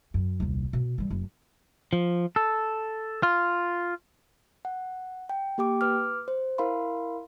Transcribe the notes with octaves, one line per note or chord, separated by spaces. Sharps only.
F#2
D#1 C2
B2
E3 G3
F#1
F3
A4
F4
F#5
G5
A#3 G4 G5 D6
B4 D6 F6
C5
E4 A#4 F5 B5 C6